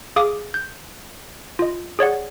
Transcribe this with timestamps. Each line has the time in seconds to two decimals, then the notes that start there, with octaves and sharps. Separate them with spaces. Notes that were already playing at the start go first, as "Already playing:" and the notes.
0.16 G#4 F5 D6 D#6
0.54 G6
1.59 F4 D#5
1.99 G#4 C#5 D5 F#5